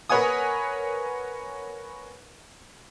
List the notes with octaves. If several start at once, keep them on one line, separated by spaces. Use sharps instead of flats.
A#4 B4 C#5 F#5 G#5 D#6